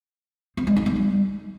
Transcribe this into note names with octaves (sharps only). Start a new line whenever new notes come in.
C4
G#3
D#4
A3
G3